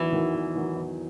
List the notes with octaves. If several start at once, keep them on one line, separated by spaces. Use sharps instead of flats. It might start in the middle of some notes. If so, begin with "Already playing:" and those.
Already playing: E2 D#3 E3 F#3
D#3 F#3
E2
D#3 F#3
E2